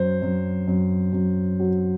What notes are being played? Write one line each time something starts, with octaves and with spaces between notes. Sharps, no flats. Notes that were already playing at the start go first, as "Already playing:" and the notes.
Already playing: F#2 C5
F#2
F#2
F#2
F#3